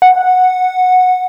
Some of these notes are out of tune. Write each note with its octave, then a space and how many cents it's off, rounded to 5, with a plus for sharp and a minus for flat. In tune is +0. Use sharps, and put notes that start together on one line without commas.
F#5 -10